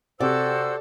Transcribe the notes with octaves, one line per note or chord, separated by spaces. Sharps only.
C3 F#4 G4 A4 C5 D5 E6